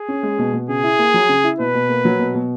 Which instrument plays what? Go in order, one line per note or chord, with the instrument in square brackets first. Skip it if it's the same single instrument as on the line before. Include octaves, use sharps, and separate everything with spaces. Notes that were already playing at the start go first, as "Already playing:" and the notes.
Already playing: [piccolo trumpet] G#4
[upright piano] C#4
G#3
B2
B2
[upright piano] C#3 [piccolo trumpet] G#4
[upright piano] E4
A#3
F#3
C#3
E4
[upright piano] B2 [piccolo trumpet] B4
[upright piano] B2
A#3
F#3
B2
B2